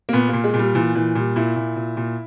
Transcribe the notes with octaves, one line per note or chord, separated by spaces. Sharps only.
A#3
A#2 B3
A#2 A#3
G#3
A#2
G3
A#2 E3
A#2 E3
A#2 G3
A#2 E4
A#2
A#2
A#2